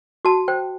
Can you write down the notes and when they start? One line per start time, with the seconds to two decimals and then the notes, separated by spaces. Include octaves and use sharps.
0.25 F#4 A5
0.48 C5 G5